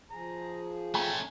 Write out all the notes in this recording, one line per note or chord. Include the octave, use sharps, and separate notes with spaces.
F3 G#4 A#5
A3 C#4 G5 G#5 A#5